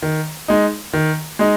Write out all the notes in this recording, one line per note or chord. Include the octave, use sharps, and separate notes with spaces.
D#3
G#3 D#4
D#3
G#3 D#4